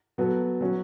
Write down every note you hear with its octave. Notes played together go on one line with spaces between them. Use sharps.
F#3 B3 F#4 A4
F#3 C#4 F#4